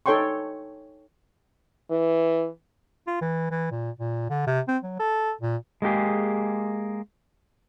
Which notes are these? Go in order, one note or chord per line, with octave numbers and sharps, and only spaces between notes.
D#4 A4 C#5 G5 C6 C#6
E3
F4
E3
E3
A#2
A#2
D3
C3
C4
F#3
A4
A#2
G#3 A#3 G4 G#4